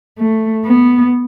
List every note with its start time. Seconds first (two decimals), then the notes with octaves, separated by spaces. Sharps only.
0.19 A3
0.65 B3